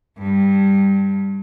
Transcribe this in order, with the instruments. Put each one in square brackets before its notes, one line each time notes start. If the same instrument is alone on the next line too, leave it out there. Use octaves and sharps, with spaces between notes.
[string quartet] G2